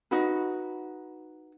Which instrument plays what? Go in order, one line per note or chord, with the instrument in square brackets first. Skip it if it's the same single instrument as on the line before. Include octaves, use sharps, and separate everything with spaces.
[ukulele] D#4 F#4 B4